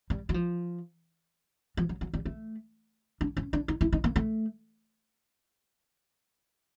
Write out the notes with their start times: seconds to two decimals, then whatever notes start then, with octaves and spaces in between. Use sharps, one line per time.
0.10 G3
0.29 F#3
0.34 F3
1.77 F3
1.89 F#3
2.01 F#3
2.13 G3
2.25 A3
3.21 D4
3.37 C#4
3.53 D4
3.68 D#4
3.81 E4
3.93 D#4
4.04 A#3
4.16 A3